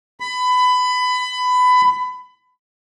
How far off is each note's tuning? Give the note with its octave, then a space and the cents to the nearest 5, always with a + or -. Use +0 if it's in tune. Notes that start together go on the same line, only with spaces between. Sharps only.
B5 +20